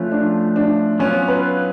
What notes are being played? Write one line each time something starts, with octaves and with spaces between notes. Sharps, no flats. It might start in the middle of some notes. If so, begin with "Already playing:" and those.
Already playing: F3 A3 C#4 F4 B4
D4
D4
F#3 B3 C#4 F4
B4